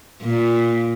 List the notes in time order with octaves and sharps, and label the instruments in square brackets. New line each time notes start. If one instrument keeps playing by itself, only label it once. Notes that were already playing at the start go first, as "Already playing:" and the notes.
[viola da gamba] A#2